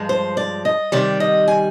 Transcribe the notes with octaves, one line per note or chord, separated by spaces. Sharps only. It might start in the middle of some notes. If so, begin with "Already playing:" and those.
Already playing: G2 F3 G#3
C5
D5
D#5
C3 D#3 G3 D5
D#5
G#5